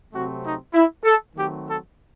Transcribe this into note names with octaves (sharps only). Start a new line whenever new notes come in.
C3 F#3 A3 C4 F#4
D#4
E4
A4
D#3 F#3 A3 C4 G4
A4